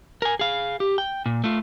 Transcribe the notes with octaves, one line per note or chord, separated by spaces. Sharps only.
A#4 G#5
G#4 F5
G4
G5
A#2
A3 F4